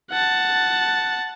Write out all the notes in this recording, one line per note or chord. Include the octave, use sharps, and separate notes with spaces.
F#5 A5